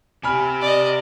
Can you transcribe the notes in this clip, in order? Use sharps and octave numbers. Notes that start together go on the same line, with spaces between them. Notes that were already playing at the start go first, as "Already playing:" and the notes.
C3 G4 G#5 B5 F6
D5 D#5